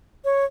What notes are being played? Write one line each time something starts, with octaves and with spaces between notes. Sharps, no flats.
C#5